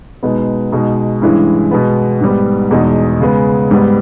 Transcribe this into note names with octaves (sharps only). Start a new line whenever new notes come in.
B2 G#3 B3 D#4
B2 G#3 D#4
G2 E3 G#3 C#4 E4
B2 G#3 B3
G#2 G3 B3
E2 B2 G#3 D#4
C#3 G#3 B3
G#2 G3 B3